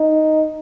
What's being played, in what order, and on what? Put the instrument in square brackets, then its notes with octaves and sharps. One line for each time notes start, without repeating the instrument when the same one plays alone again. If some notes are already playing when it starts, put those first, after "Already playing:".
Already playing: [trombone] D#4